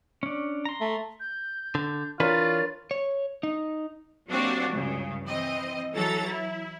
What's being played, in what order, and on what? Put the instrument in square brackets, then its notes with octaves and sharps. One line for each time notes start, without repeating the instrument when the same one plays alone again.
[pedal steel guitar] C#4 D4
A#5 C6
[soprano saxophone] A3
[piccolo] G6
[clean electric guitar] D3
[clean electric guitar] E3 D4 B4 [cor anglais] F4 [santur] A#4 C#5 [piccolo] A6
[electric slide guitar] C#5
D#4
[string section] F#3 A#3 C4 D4 F#4 G4
C#2 G2 C#3
E3 C4 D#5
E3 F#3 A4 A#5 A6
E4